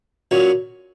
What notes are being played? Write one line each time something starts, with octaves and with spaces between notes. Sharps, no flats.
A#2 F#3 C#4